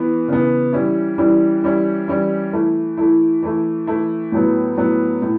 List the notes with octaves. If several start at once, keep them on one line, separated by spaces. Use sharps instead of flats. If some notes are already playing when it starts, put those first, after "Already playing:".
Already playing: E3 B3
C#3 E3 B3
E3 G3 C#4 E4
E3 G3 C#4 E4
E3 G3 C#4 E4
E3 G3 C#4 E4
E3 A3 E4
E3 A3 E4
E3 A3 E4
E3 A3 E4
A2 F#3 B3
A2 F#3 B3
A2